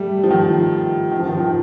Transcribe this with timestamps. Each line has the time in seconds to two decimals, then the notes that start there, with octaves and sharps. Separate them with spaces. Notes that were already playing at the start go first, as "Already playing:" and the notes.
Already playing: G3 A3
0.23 F3
0.31 D#3
1.12 D#3
1.19 F3
1.26 D#3
1.32 F3
1.40 D#3